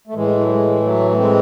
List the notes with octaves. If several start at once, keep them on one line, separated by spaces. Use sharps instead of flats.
A3
A2 E3 G#3
F#3
G#3
F#3 A3
A3
G#3 C4